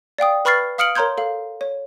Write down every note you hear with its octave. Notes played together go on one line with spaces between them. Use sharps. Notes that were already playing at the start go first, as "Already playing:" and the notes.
D5 F5 G5 D#6
B4 B5 C#6 F6 A6 C7
F5 D#6 F6 C#7 D7 F#7
A#4 C#5 A#5 C6 G6 G#6
A4 F5
C#5